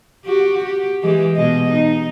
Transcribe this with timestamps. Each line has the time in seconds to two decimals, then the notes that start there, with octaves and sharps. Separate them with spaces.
0.25 F#4 G4
0.65 G4
1.03 E3 G#3 G4
1.36 B2 G#3 D#5
1.72 D#4